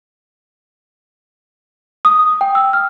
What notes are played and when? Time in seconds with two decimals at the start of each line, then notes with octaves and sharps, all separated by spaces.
2.05 D#6
2.41 G5
2.55 E6
2.73 F6